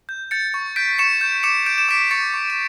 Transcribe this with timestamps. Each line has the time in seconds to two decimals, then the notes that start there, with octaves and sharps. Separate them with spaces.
0.09 G6
0.31 G6 A6 C#7
0.54 C#6
0.76 G6 B6 D7
0.99 C#6 C#7 E7
1.21 G6
1.43 D6 C#7 E7
1.66 G6 D7
1.78 E7
1.89 D6 B6 D7
2.11 C#6 A6 C#7
2.34 C#6
2.50 E7